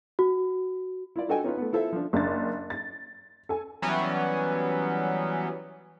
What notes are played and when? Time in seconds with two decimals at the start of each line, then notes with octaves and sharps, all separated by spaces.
0.19 F#4
1.16 E4 F4 D5
1.29 D4 F#4 A4 D#5 G5 G#5
1.44 C#4 D#4 F4 B4
1.57 A3 B3
1.73 E4 F4 A4 C5 E5
1.92 F3 D4
2.13 F#1 D4 A6
2.70 A6
3.49 A4 G#5
3.82 E3 F#3 G3 B3 C#4